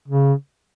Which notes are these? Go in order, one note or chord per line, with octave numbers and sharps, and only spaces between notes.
C#3